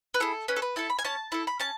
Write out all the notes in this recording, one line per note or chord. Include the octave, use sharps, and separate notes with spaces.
B4
E4 G#4 A4
C#4 B4
A4
B4
E4 A4 A5
B5
G#5
C#4 A5
E4 A4
B5
C#4 A5